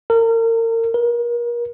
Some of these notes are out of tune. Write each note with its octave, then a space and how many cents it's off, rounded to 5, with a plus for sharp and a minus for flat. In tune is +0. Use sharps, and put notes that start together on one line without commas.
A#4 -35
A#4 +35